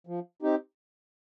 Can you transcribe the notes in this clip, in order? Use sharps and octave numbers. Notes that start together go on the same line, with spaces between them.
F3
C4 D#4 G4